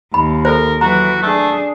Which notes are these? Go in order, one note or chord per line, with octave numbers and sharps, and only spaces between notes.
D#2 B5
A4 A#4 C5
E3 F#3 F#4 A#5
A3 D4 G#4